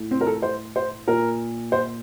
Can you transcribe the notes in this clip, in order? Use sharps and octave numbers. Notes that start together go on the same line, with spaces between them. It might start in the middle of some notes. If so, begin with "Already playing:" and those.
Already playing: A2
C4
A#4
A4
C5
C5
A#2 A#4
C5